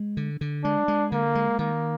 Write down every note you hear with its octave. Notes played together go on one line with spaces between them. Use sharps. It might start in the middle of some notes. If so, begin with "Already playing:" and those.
Already playing: G#3
D3
D3
G#3 D4
G#3
D3 A#3
G#3
D#3 A#3